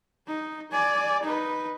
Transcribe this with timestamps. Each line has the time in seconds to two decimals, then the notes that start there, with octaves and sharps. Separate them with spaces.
0.27 D#4
0.72 D5 G#5
1.23 D#4 B4